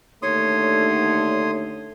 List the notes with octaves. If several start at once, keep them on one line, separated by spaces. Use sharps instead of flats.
D#2 D3 A3 C#5 C6 D#6